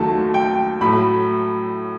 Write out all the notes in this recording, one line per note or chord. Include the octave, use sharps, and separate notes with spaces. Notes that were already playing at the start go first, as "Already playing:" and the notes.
Already playing: D#2 D#3 F#3 A3 A5
G5
A2 F#3 A3 B5